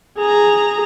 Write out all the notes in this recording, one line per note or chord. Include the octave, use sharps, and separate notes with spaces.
G#4 A#5